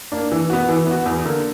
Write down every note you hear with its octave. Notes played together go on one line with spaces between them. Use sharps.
A#3 D4
E3
B3 F#4
E3
B3 F#4
E2
D3 A#3